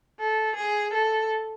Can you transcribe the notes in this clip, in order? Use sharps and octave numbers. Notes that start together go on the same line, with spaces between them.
A4
G#4
A4